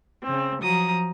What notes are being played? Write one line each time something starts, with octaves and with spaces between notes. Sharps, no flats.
C#3 C4
F3 F#3 A#5 D#6